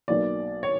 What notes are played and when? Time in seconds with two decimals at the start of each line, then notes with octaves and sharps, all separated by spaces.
0.08 B1 B2 F#3 A#3 D5
0.63 C#5